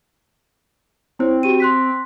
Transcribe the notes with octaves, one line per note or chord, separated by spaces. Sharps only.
C4 E4 C5 C#5
F#4 G4 D#7
C6 F#6 B6